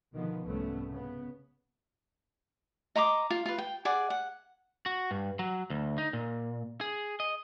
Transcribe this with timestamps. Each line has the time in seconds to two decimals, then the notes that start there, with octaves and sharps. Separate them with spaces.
0.13 B2 D3 D#3 F3 B3
0.45 C2 G#2 C3 A3 B3 C#4
0.90 C#3 B3
2.96 D#5 A#5 C6 D6
3.30 F4
3.46 F4 B4
3.58 G5
3.85 G#4 D5 F#5
4.10 F#5
4.86 F#4
5.11 G2
5.39 F#3
5.70 D2
5.98 D#4
6.13 A#2
6.81 G#4
7.20 D#5